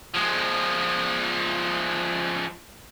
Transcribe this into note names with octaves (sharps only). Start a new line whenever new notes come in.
F3 G#3